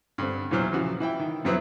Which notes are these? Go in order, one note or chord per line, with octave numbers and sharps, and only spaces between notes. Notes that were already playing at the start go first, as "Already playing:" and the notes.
G2 D3 C4
E2 A#2 E3 F#3 C5 F6
C#3 E3 F3 F#4
E3 E4 G5
D#3
F2 F3 F#3 B3 C4 E4